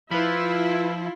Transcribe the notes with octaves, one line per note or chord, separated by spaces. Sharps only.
F3 E4 F4 B4 B5